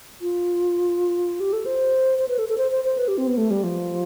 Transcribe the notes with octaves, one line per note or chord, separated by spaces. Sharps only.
F4
G4
A4
C5
C5
B4
A4
A4
C5
C5
C5
B4
G4
C4
B3
A3
G3
F3